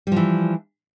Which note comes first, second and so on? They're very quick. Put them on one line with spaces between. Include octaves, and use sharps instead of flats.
G3 F3 E3